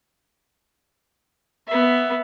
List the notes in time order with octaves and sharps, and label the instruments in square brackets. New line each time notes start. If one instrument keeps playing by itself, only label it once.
[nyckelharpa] B3 E5